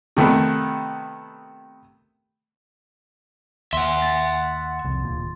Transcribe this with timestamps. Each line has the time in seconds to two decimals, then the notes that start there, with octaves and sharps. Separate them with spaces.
0.17 C3 D#3 A3 B3
3.73 D#2 E5 F#5 C6
4.02 A6
4.84 C2 F2
5.04 D1 D#2 A#2